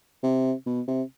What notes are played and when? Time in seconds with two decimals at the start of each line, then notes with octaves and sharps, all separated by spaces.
0.23 C3
0.66 B2
0.88 C3